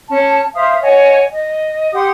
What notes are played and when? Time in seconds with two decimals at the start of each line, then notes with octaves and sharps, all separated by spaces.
0.08 C#4 A5
0.55 C5 E5 F5 D#6
0.80 C#5 D#5 F#5 G#5
1.32 D#5
1.92 G4 F#5 C6 D#6